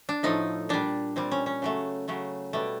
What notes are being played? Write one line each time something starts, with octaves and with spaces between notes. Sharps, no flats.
D4
A2 F3 A3 D#4
A#2 G3 D4
A#2 G3 C4
C#4
C#4
C#3 F#3 A3
C#3 F#3 A3
B2 G3 A3